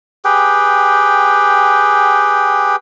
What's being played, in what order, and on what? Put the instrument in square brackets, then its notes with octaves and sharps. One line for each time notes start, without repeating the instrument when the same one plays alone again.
[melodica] G4 G#4 B4 G5